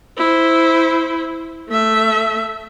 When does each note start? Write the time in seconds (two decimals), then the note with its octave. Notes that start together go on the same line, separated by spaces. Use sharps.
0.18 E4 C5
1.69 A3 E5